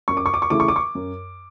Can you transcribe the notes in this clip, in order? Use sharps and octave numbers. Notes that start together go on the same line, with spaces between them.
F#2 C#6
D6
C#6
D6
C#6
C#3 E3 A3 E4 D6
C#6
D6
C#6
F#2